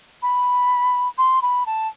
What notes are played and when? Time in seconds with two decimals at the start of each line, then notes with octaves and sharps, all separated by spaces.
0.22 B5
1.18 C6
1.42 B5
1.66 A5